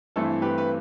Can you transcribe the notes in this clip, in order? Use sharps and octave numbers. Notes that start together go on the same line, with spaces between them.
G2 E3 A3 C4 E4 A4
G4 B4
B4